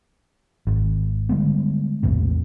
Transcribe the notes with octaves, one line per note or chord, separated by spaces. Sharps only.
G#1
D3 G3 G#3 B3
A#1 E2 A2 C3